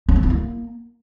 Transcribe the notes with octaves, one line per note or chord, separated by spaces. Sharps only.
C#4
C4
E4
A#3